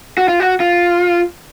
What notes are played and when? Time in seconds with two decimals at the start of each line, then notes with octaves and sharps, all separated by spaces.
0.18 F#4
0.28 F4
0.40 F#4
0.60 F4